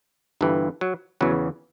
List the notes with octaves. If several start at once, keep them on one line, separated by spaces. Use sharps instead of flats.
G1 G2 E3
F#3
E2 C#3 E3 F#3